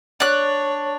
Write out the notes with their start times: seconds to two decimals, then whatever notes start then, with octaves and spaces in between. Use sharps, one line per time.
0.20 D4 C#5 F#6